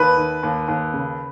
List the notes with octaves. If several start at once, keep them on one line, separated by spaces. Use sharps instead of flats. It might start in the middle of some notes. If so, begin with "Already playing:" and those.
Already playing: D#2 B4
D#3
D#2
D#2
C#3